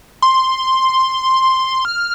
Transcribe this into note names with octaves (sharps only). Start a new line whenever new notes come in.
C6
F6